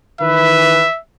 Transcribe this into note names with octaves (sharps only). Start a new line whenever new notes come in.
D#3 E3 B4 E5